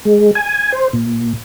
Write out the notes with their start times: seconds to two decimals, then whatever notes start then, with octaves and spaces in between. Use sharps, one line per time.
0.05 G#3
0.35 G#5
0.72 C5
0.93 A#2